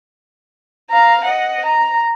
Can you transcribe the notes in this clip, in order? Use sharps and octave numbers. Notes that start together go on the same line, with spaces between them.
F5 A#5
D#5 F#5
A#5